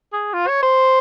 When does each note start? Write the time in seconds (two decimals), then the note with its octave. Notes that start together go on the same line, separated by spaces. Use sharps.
0.12 G#4
0.33 F4
0.48 C#5
0.62 C5